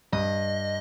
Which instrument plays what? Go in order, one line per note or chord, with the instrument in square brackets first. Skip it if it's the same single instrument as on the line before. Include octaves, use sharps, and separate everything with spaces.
[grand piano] G2 [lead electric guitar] D#5